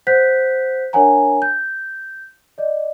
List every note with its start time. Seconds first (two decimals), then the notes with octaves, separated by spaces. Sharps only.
0.07 C5 F#5 F#6 G6 B6
0.93 D4 A#4 C#5 F#5 G#5 A#5
1.42 G6
2.58 D5 D#5